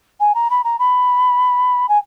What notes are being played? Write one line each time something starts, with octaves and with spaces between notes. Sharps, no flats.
G#5
A#5
B5
A#5
B5
G#5